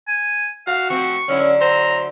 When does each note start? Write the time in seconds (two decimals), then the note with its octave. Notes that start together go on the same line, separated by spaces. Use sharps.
0.08 G#5
0.67 F#4 F5
0.90 A2 F3 C4 C#6
1.28 D3 F#3 C#4 E4
1.61 C5 A#5